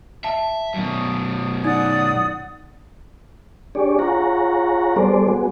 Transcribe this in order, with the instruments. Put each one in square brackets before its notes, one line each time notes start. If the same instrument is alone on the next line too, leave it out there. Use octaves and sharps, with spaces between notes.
[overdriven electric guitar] E5 [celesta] A5
[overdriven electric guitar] F#2 B2
[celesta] D#4 [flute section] D5 F#5 D#6
[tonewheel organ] D4 G4 G#4 C#5 D5
F4 G#4 C#5 F#5 A#5
G3 B3 G#4 A4 C5 D5
B3 F#4 G#4